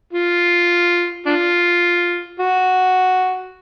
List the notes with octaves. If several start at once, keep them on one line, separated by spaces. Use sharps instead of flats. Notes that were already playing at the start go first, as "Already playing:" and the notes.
F4
D4 F4
F#4